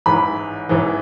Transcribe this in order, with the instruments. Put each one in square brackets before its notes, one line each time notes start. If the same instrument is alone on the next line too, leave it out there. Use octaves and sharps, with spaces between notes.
[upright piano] A1 G#2 E3 B5
A1 G#2 E3